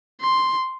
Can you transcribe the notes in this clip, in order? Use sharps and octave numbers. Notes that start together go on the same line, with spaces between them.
C6